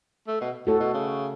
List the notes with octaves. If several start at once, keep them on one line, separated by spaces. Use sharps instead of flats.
A3
B2
A2 A3 F#4 A4
B2
C#3